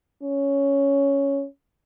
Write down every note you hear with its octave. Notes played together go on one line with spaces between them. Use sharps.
C#4